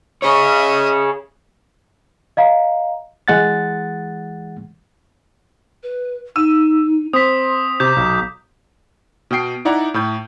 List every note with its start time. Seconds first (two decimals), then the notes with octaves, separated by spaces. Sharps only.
0.22 G#4 C#5 D#5 E5
2.37 D#5 F5 A#5
3.28 E3 G#3 F#5 A6
5.83 B4
6.36 D#4 E6 D#7
7.13 C4 C6 D#6 B6
7.80 C3 A#5 D6 G6
7.96 B1
9.31 B2 B3 G5 C7 D7
9.65 D#4 E4 D5 F#5 A#5
9.94 A2 B5 G6